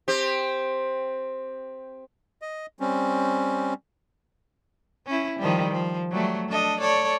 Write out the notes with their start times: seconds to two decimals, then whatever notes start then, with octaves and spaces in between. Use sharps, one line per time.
0.08 C4 G4
2.42 D#5
2.80 G3 C4 C#4
5.06 C#4 E4
5.39 D#3 F3 G3
5.71 F3
6.11 F#3 G3 A3
6.49 D4 A4 D#5
6.80 A4 C#5 D5